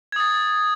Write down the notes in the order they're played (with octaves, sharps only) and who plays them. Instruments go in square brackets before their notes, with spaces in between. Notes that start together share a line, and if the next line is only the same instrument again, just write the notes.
[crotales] G#6
D#6
A6